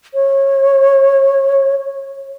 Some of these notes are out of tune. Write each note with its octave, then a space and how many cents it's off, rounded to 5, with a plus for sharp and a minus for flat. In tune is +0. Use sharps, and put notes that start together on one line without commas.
C#5 -25